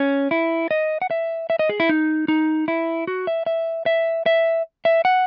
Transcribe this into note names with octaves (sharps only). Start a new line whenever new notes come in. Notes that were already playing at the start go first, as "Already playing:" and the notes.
Already playing: C#4
E4
D#5
F#5
E5
E5
D#5
G#4
E4
D#4
D#4
E4
F#4
E5
E5
E5
E5
E5
F#5